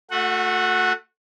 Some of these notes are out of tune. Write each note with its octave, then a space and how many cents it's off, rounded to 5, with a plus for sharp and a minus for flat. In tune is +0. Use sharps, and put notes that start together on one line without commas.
A3 +10 F#4 -30 F#5 +0